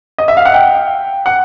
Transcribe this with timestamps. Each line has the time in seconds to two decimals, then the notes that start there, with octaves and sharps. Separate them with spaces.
0.18 D#5
0.28 E5
0.37 F5
0.45 F#5
0.54 G5
1.26 F#5